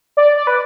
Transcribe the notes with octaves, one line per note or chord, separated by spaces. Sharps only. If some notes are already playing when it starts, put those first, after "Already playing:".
D5
D5
B4